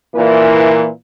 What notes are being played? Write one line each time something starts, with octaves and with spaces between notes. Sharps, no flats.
A#2 E3 A#4